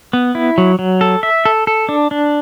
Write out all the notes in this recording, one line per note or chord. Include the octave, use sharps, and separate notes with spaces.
B3
E4
F#3
F#3
A4
E5
A4
A4
D4
D4